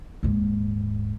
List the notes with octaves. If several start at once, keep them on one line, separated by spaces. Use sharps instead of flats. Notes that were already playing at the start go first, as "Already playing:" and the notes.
D#1 G#2